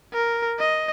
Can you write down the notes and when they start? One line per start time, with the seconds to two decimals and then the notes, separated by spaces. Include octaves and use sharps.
0.14 A#4
0.60 D#5